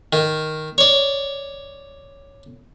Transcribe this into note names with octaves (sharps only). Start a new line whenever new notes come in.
D#3
C#5 D5